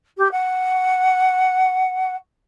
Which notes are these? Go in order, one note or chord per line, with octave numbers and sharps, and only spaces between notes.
G4
F#5